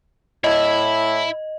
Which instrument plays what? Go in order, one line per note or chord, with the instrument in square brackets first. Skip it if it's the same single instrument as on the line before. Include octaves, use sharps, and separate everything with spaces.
[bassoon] A2 [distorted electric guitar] E4 E5 [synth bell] D#5